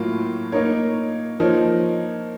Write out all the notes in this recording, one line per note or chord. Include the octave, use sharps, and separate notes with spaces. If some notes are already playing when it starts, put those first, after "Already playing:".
Already playing: A2 F#3 A#3 F4
A#3 D#4 A#4 C#5
F3 A#3 D#4 A#4 C#5